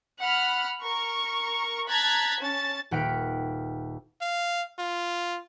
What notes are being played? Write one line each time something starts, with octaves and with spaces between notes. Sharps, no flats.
F#5 B5 F6
A#4 C#6
A5 A#5 F#6 G#6 A6 B6
C#4 A5 A6
D#1 F#5 G5 F6 B6 D7
F5
F4